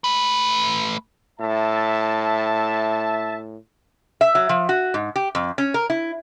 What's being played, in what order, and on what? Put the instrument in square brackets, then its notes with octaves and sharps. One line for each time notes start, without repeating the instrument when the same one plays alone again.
[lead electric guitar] A3 B4
[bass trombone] A2 [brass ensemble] E5 A5
[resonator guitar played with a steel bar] E5
F#3
F3
F#4
G#2
G4
F2
C#4
A#4
E4